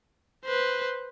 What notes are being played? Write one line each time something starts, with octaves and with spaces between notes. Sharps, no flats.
B4 C5